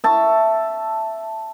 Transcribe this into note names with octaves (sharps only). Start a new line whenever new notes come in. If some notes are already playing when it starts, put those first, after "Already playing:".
E5 A5 C#6